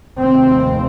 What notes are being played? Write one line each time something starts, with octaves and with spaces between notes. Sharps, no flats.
F1 D#2 C4